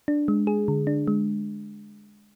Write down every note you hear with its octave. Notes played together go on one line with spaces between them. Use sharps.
D4
G#3
G#4
D3
D4
G#3